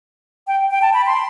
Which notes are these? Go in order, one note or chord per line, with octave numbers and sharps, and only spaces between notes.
G5
G5
A5
B5
C6